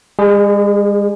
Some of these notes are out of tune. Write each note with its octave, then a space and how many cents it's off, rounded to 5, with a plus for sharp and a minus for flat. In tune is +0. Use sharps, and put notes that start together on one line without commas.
G#3 -45 G#4 +0